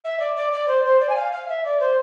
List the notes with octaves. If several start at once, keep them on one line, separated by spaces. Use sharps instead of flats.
E5
D5
D5
D5
C5
C5
D5
G#5
F5
F5
E5
D5
C5